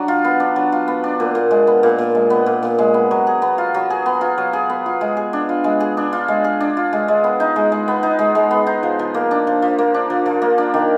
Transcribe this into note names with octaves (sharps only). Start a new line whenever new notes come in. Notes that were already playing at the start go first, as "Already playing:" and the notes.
Already playing: F#3 D4
F4
B3
D4
F#3
F4
B3
D4
A#2
A#2
G#3
B3
A#2
A#2
G#3
B3
A#2
A#2
G#3
B3
F#3
G#4
B3
F4
F#3
G#4
B3
F4
F#3
G#4
B3
F4
G#3
G#4
D4
F4
G#3
G#4
D4
F4
G#3
G#4
D4
F4
G#3
G#3
B3
D#4
G#3
G#3
B3
D#4
G#3
G#3
B3
D#4
F3
F3
A#3
D4
F3
F3
A#3
D4
F3
F3
A#3
D4
D#3